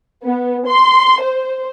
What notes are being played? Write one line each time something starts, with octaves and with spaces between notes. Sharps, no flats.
B3
C6
C5